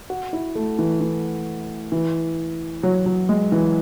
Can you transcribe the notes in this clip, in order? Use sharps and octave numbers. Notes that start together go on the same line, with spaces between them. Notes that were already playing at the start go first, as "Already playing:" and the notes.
F#4
E4
A3
E3
E3
E3
F#3
F#3
G#3
E3